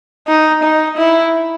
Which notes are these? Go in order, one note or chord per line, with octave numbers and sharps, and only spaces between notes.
D#4
D#4
E4